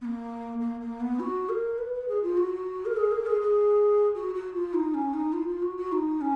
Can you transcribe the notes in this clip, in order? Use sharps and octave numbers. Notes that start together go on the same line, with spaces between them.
B3
A#3
A#3
A#3
B3
F#4
A#4
B4
B4
G#4
F4
F#4
A#4
G#4
A#4
G#4
G#4
F#4
F#4
F4
D#4
C#4
D#4
F4
F4
F#4
F#4
D#4
C#4